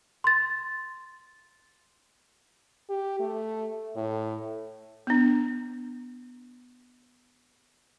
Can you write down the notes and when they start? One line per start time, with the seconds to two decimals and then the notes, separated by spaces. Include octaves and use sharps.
0.24 C6 A6
2.89 G4
3.20 A3
3.96 A2
5.07 B3 D4